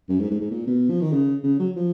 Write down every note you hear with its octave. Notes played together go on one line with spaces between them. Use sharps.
F#2
G#2
G#2
G#2
A#2
B2
F3
D#3
C#3
C#3
F#3
F3